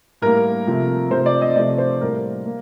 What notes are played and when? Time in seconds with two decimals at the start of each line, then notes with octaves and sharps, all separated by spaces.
0.22 A2 G3 A#3 A#4
0.67 C3 F3 A3
1.11 C3 F3 A3 C5
1.26 D5
1.41 D#5
1.56 C3 F3 A3 D5
1.78 C5
2.01 A2 G3 A#3 A#4
2.46 A#3